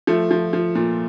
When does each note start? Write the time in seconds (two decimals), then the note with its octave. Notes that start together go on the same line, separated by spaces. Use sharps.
0.07 F3 A3
0.31 F3
0.53 F3
0.75 A#2